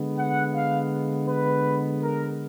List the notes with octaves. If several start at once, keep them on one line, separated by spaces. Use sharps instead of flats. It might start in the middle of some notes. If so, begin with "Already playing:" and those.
Already playing: D3 G#3 B3
F#5
F5
B4
A#4